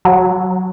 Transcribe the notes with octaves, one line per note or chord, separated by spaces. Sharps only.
F#3